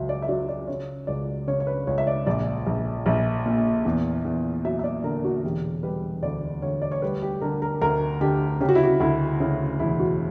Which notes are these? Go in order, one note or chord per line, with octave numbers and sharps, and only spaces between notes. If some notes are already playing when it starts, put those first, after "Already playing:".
Already playing: C#2 F#3 E5
D5
E5
F#3 D5
D5
C#3 C#5
C#2 D5
C#3 C#5
C#5
B4
C#2 C#5
E5
D5
A#1 D5
A#1
A#1
A#2
E2
E2
F#3 E5
E5
D5
D3 A#4
F#4
E1 G4
G3 B4
D2 D5
D2 C#5
D5
C#5
G3 B4
G4
D3 A#4
A#4
D2 A#4
D3 G4
C#3 G4
F#4
E4
F#4
D2 E4
C#3 E4
E1 E4
F#4